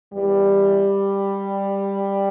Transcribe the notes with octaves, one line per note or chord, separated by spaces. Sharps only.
E2 E3 G3